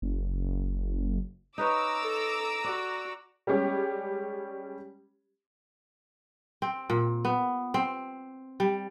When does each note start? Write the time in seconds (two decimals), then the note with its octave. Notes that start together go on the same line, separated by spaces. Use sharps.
0.02 F#1
1.58 D#4 B4 C#5 A#5 D6 E6
2.03 A4
2.64 F#4 D5
3.47 G3 G#3 C#4 G4
6.62 C4
6.90 A#2
7.25 B3
7.74 C4
8.60 G3